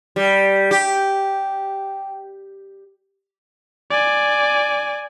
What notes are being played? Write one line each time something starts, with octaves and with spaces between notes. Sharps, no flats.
G3
G4
D5 G#5